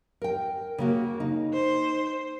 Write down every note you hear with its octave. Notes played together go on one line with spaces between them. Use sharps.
A#4 G5
C#3 A#3 F#4
D#4
C5